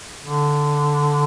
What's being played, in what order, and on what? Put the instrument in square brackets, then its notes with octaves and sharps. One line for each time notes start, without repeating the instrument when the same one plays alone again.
[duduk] D3